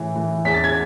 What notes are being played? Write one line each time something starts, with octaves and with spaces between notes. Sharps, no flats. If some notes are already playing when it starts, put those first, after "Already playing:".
Already playing: A2 E3
E3
E2 B6
A6
G#6